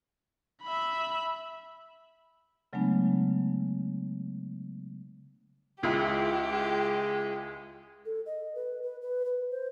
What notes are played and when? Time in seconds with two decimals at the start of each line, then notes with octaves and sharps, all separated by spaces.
0.63 E5 B5
2.73 C#3 F#3 G#3 A3 B3 D4
5.83 C#2 G#3 E4 G4
6.52 G#3
8.06 A4
8.26 D#5
8.55 B4
8.83 B4
9.02 B4
9.26 B4
9.51 C5